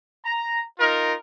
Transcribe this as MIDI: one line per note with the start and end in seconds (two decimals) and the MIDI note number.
0.25 0.61 82
0.79 1.14 63
0.79 1.14 65
0.79 1.14 70